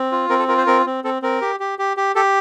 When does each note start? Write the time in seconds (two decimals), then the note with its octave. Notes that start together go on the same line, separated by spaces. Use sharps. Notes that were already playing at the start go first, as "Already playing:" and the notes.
Already playing: C4
0.12 F4
0.29 C4 A#4
0.39 A4
0.48 F4 A#4
0.58 C5
0.67 C4 A#4
0.86 C4
1.04 C4 A4
1.22 C4 A#4
1.42 G4
1.60 G4
1.79 G4
1.97 G4
2.15 G4 A4